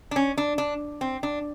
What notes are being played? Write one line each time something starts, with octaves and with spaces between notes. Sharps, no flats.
D4
C#4
D4
D4
C4
D4